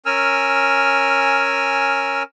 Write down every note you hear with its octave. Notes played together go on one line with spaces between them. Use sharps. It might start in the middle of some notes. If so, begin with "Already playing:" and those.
C#4 A#4 G#5 E6 F6